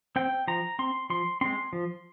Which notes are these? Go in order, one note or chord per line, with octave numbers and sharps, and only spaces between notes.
C4 G5
F3 A#5
C4 C6
F3 C6
G#3 C4 C6
F3